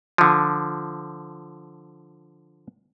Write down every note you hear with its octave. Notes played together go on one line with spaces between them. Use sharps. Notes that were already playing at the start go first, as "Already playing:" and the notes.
D3 F3